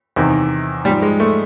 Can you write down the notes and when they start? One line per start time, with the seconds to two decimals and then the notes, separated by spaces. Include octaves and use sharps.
0.16 E2 C3 D#3
0.85 G#2 G3
0.88 F3
1.02 G#3
1.20 A3